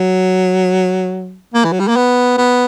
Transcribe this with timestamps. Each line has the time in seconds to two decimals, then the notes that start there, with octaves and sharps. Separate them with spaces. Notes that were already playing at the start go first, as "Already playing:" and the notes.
Already playing: F#3
1.54 A#3
1.64 E3
1.72 F#3
1.80 G3
1.88 A#3
1.96 B3
2.37 B3